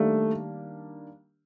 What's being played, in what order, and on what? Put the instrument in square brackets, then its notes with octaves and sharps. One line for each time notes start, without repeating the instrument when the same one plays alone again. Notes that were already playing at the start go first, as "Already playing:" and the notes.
Already playing: [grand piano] D#3 G3 A#3 D4 [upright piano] A3